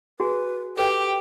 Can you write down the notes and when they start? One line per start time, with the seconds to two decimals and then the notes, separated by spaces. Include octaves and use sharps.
0.20 F#4 G#4 B4 G#5
0.77 G4 A4 B4 E5 G5